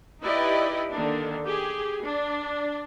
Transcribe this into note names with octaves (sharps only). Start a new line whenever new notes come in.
D#4 E4 G4 B4 D5 D#5
D3 D#3 A#3 D4
G4 G#4
D4